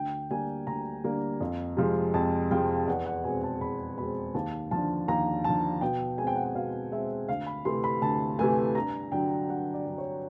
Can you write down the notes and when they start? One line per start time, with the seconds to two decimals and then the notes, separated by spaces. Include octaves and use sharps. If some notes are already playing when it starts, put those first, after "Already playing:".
Already playing: D2 G5
0.30 D3 G3 A#3 G#5
0.67 D2 A#5
1.04 D3 G3 A#3
1.40 F2
1.77 C3 F3 G#3
2.14 F2 A5
2.51 C3 F3 G#3 G5
2.87 E2 F#5
3.06 F#5
3.24 B2 G#3 C4 G#5
3.43 A5
3.61 E2 B5
3.97 B2 G#3 C4 B5
4.35 D#2 A5
4.71 D3 F3 A5
5.08 D#2 A#5
5.44 D3 F3 A5
5.81 B2 G5
6.18 G#3 C4 G#5
6.27 G5
6.35 F#5
6.44 G5
6.55 B2 F5
6.92 G#3 C4 E5
7.29 D2 F5
7.47 B5
7.65 C3 E3 A3 C6
7.84 B5
8.02 D2 A5
8.39 C3 E3 A3 G#5
8.75 G2 A#5
9.12 D3 F#3 G5
9.49 G2 F#5
9.74 D5
9.86 D3 F#3
9.98 C#5